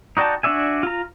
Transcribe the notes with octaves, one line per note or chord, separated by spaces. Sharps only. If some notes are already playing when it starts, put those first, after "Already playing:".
D#4 F#4 D5 G5 A5
D4 F#4 D5 E5 G#5
F4 A#5